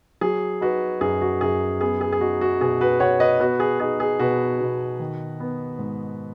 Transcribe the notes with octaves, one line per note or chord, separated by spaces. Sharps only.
F#3 G#4
D#4 F#4 B4
F#2 G#4
F#4
F#2 G#4
B3 G#4
G#4
G#4
D#4 F#4
F#4
B2 G#4
F#4 B4
B2 C#5 F#5
B4 D#5
B3 F#4 B4
G#4
D#4 G#4
G#4
B2 F#4 B4
B2
D#3
B3
G#2